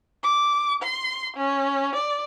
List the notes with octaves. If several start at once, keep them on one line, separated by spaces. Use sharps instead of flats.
D6
C6
C#4
D5